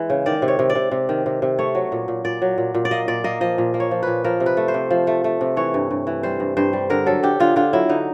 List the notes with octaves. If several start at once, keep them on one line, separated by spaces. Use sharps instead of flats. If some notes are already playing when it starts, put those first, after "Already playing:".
Already playing: E3 G#3
C#3
D#3 D5
C3
C#5
C3
D5
C3
C3
D#3
C3
C3
A3 C#5
F#3
A#2
A#2
A#2 D5
F#3
A#2
A#2
D5
A#3 D#5
A#2 D5
A#3 D#5
F3 D#5
A#2
A#3
C#5
F3
A#2 B4
F3 A#4
C3
B4
A3
C5
C3
F3
A3
A3
C3
E3 C#5
G2
G2
E3
G3 C5
G2
G2 C5
G3
D3 A#4
F#3 A4
D3 G4
D3 F4
D3 F4
F#3 E4
D3 D#4